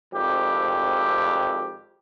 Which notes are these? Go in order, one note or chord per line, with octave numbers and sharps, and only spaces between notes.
G#1 F2 G4